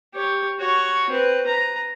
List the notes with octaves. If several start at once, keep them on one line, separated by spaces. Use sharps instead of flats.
G4 C#5
F#4 C#5
C4 B4
B4 A#5